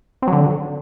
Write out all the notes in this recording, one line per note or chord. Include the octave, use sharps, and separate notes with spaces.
C4
F#3
D3